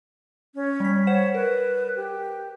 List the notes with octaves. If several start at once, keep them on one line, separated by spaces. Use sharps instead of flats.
C#4
G3 B6
C5 C#5 F#5 E7
A#4 B4
G4